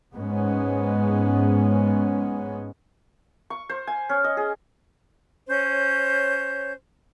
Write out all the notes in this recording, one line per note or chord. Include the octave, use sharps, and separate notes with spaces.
G#2 G#3 B3 C#4
C#6
C5
G#5
C#4
D#5
G#4
C#4 C5 C#5 G6